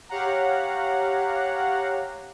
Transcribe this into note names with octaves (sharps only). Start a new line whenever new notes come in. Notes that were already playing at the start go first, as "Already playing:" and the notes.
G4 C#5 F5 F#5 A#5